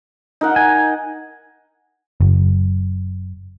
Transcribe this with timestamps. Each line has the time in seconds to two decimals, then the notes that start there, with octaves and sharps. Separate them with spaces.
0.41 D#4 A#4 F#5
0.56 G#5
2.20 F#1